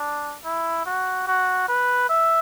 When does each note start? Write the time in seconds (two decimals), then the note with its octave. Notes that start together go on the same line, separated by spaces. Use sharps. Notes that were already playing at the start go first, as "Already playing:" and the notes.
Already playing: D4
0.45 E4
0.86 F#4
1.27 F#4
1.68 B4
2.10 E5